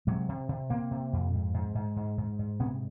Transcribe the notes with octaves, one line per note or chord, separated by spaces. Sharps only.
C3 F#3 G#3
C3
C3
C3 A#3 C4
C3
F2
G#2
G#2
G#2
G#2
G#2
G#2
C3 B3 C#4